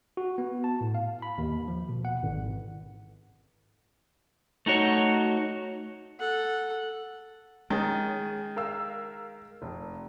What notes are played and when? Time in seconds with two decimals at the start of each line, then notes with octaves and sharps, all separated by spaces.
0.17 F#4
0.38 B3
0.64 A5
0.81 A2
0.95 F5
1.22 B5
1.38 D#2
1.68 F3
1.89 B2
2.05 F#5
2.23 G#1
4.66 A3 D#4 F#4 C#5
6.20 A4 F#5
7.70 D#3 G#3 C#4 G#4 A6
8.56 A#4 F5 E6
9.62 F1